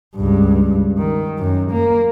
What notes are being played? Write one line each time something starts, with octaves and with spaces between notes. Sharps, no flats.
C#2 G2
D#3
F#2
A#3